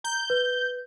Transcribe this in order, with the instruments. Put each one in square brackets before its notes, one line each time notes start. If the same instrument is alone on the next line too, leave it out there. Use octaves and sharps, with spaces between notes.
[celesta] A#5 [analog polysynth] G6
[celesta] B4